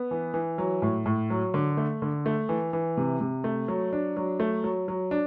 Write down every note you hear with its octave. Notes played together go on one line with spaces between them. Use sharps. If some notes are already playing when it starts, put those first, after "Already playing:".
Already playing: B3
E3
E3
F#3
A2
A2
F#3
D3
A3
D3
A3
E3
E3
C3
C3
A3
F#3
D4
F#3
A3
F#3
F#3
D4